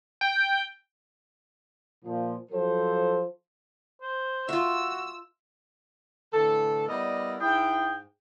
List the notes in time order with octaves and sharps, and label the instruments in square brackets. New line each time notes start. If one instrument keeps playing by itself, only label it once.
[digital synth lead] G5
[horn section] A#2 F3
F3 F#3 A4 C5
[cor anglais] C5
[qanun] F4 E5 [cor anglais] F#4 [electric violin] E6
[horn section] A2 D3 E3 A4
G3 B3 E4 A#4 D5 D#5
G#2 E4 G#4 G5